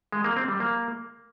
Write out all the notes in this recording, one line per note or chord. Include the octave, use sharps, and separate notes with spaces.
G#3
A#3
C4
G3
A#3